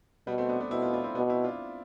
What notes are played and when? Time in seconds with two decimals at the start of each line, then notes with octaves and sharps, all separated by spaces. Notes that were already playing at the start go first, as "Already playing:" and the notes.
0.27 B2 G3 B3
0.38 A3 C4
0.49 B3 D4
0.60 B3 D4
0.71 B2 C4 E4
0.82 D4 F4
0.93 D4 F4
1.04 C4 E4
1.15 B2 B3 D4
1.30 C4 E4
1.44 D4 F4